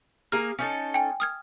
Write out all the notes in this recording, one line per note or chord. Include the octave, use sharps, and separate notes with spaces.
A#3 G#4 A#5 F6
C#4 D#4 A4
G5 G#5
D#6 F6 G#6